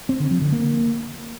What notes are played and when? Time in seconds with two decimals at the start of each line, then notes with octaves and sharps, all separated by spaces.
0.09 C4
0.20 D3
0.31 F3
0.42 D3
0.53 A#3